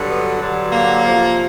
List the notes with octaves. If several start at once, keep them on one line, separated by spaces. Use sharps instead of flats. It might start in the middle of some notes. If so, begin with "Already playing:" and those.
Already playing: G2 D3 F#3
B3
G2 D3 F#3
A#3
F2 C3 F3